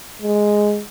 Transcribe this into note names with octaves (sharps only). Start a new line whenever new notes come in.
G#3